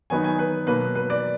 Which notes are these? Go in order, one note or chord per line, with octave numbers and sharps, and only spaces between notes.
D#3 F#3 B3 D#4 G#5
G#5
B4
B2 F#3 A#3 B4
B4
D5